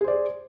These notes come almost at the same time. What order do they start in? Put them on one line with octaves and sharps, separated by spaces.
G#4 C5 D5